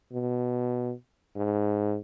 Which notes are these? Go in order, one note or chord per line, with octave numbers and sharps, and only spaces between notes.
B2
G#2